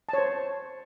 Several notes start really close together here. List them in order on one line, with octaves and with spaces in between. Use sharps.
A5 C#5 C5